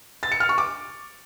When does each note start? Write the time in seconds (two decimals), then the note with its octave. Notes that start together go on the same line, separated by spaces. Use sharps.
0.23 A6
0.32 C#7
0.40 F6
0.49 C#6
0.58 D6